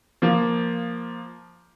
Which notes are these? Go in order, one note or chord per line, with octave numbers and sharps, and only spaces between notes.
F3 A#3